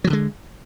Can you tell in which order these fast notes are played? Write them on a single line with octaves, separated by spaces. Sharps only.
F#3 E3 D3 G#3